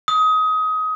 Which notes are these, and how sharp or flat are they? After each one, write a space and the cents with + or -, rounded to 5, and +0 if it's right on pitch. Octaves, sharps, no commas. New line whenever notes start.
D#6 +25